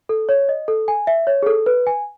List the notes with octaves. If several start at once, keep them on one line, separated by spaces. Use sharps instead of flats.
A4
C#5
D#5
A4
G#5
E5
C#5
G#4
A4
B4
G#5